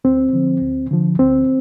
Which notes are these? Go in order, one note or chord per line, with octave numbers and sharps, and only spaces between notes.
D2 C4
D3 F3
D2
D3 F3
D2 C4